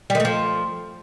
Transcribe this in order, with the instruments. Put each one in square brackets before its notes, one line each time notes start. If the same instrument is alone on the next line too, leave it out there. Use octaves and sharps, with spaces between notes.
[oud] G3
D#3
A3
F3